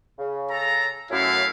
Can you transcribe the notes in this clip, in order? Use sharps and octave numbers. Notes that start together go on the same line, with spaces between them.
C#3
A4 A#5
F#2 A3 E4 F5